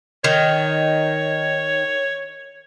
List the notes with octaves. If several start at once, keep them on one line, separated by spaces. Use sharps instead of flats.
D#3 C#5